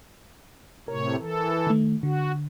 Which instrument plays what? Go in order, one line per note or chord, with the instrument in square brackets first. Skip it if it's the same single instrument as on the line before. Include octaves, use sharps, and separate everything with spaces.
[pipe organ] A2 C3 C#5 [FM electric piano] A#4
[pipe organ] E3 A4
[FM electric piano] D#3 A3
[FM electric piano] D3 [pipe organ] F#4